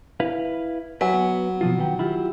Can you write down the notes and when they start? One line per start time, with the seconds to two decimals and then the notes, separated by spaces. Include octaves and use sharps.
0.20 E4 B4 F5
1.01 F#3 B4 E5 G#5
1.13 B3
1.61 B2 F3 F4
1.78 D#3 B3 G5
1.99 E4 F4 G4